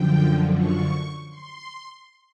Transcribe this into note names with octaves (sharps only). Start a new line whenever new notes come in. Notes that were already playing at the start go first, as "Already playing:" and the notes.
Already playing: F#2 D3 F3 G5
C#6
C6